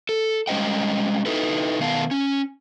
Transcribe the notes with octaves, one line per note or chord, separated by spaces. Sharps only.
A4
G3 G#3 C#4 C5 D#5 G5
D#4 E4 A4 B4
B2 D#3 B3 F5 A5
C#4